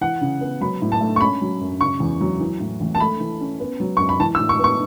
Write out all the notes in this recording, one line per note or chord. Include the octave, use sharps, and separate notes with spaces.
E3 F#5
C#3
B3
F#3 B5
A2
A5
A3
C#6
C#4 B5
F#3
F#2
C#3 C#6
E2
F#3
E3
A2
A1
A5
A3 B5
E3
C#4
B3
F#3
F#2 C#6
B5
E3 A5
E6
A2
C#6
B3 C#6